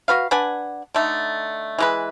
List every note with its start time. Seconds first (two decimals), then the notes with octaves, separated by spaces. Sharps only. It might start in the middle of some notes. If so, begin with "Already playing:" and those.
0.08 F#4 B4 F5
0.31 D4 B4 F#5 G#5
0.94 D3 A3 D#4
1.78 E3 G#3 B4